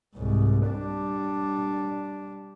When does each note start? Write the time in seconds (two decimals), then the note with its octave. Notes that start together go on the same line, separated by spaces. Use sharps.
0.16 C2 G#2
0.68 G3 D4